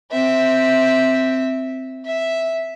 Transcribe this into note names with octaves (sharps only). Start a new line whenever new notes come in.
C4 E5
E5